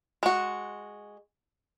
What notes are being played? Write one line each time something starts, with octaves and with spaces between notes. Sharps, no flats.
G#3 F#4